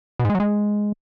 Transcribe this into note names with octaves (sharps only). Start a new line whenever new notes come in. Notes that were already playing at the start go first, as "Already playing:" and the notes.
B2
G#2
G#3
F#3
G#3